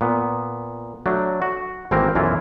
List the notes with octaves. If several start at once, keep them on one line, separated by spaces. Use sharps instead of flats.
A#2 B3
F#3 A3 D4
F#4
G#1 E3 A3 A#3 C4 A#4
B1 F#2 E3 E4 F4